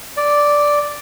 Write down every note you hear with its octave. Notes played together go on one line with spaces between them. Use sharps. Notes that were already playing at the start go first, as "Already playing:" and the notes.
D5